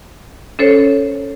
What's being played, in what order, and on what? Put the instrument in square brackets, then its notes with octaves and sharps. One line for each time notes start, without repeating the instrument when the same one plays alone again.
[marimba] C#4 A4 C5 C#5